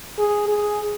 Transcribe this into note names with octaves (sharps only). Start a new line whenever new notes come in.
G#4
G#4